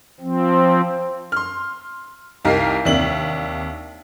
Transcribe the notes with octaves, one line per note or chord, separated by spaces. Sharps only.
F3 C4
C6 F6
C2 D#4 G4 A#4 F5 C7
D#2 C3 A#3 D4 E5 F#7